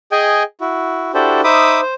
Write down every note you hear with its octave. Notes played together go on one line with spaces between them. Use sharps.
G#4 D#5 G5 G#5
E4 F#4
D4 E4 F#4 G4 A4 C5
D#4 C5 E5 B5 D6 D#6
C5